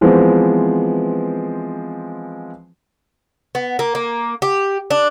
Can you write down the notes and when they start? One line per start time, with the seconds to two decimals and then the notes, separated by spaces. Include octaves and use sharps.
0.01 E3 F3 G#3 B3 C4
3.55 B3
3.79 A#3
3.95 A#3
4.42 G4
4.91 D4